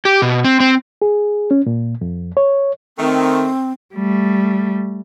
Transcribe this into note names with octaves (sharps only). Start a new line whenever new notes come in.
G4
B2
C4
C4
G#4
C#4
A#2
F2
C#5
D#3 A3 C4
G3 A3